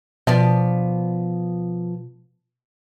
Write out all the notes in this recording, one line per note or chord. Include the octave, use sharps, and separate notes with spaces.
B2 F3 B3 D5